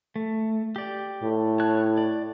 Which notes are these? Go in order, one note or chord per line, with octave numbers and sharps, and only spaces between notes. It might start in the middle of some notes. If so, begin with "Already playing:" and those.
A3
G4 D5
A2
C#5 A5 F#6
D5